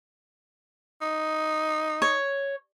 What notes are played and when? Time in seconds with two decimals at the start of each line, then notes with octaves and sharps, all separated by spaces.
1.01 D#4
2.02 C#5